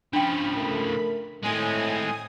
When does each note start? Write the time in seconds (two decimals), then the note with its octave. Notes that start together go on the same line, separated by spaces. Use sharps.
0.13 C#3 F3 D4 G5 B5
0.55 A3 A#4
1.43 A2 G#3 C4 G#5 D#6